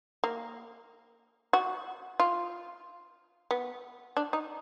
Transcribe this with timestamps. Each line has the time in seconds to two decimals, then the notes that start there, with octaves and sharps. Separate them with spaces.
0.24 A#3
1.53 F#4
2.20 F4
3.51 B3
4.17 D4
4.33 D#4